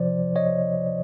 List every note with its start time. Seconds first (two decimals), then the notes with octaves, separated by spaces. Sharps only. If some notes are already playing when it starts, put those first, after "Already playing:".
Already playing: C3 F3 C5 D5
0.36 C#5 D#5